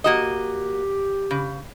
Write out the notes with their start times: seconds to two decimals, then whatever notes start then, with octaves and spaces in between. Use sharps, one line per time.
0.04 A#3 F#4 G4 D#5
1.31 C#3